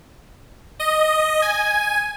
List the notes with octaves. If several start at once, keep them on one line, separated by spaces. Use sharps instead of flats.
D#5
G#5